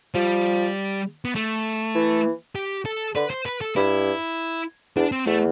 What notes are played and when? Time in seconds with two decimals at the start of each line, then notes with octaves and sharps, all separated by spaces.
0.15 F3 G3
1.25 B3
1.35 A3
1.95 E3
2.55 G4
2.86 A4
3.15 D3 B4
3.30 C5
3.46 B4
3.61 A4
3.76 G2 E4
4.96 E2 D4
5.12 C4
5.26 E2 A3